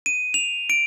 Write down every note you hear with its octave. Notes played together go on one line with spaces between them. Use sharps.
D#7
F7
D7